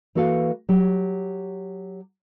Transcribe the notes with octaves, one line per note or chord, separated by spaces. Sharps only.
E3 A#3 F#4 A4 B4 F5
F#3 G4